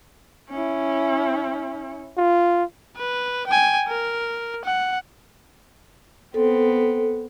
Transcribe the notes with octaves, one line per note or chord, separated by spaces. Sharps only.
C#4 E4
F4
B4
G5 G#5
A#4
F#5
B3 C4 A4